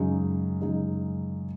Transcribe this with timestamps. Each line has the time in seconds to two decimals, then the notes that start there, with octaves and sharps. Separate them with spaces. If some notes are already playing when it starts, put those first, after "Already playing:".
Already playing: F#2 C#3 G#3 D#4
0.61 F#2 C#3 G#3 D#4